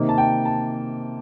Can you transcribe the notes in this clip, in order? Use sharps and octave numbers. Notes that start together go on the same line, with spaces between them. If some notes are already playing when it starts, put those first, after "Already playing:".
Already playing: C3 D#3 A#3 D#4
A5
G5
A5